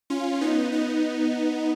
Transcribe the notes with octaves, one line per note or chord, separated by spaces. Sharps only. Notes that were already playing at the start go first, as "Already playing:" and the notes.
C#4 F4
B3 D#4
B3 D#4